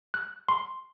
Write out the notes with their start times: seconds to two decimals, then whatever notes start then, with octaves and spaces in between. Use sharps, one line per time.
0.14 F#6
0.48 C6